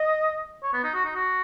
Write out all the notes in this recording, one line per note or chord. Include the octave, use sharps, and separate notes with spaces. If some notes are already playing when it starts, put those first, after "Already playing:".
Already playing: D#5
C#5
B3
D#4
F#4
D#4
F#4